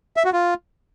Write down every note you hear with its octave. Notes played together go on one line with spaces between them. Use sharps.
E5
F#4
F4